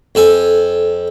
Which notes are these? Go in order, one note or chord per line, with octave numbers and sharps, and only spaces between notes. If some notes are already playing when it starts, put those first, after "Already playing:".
F2 A4 G#5